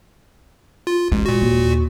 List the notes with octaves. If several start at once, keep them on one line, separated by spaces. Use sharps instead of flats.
F4
A1 G#3
A#2 F#4
D#2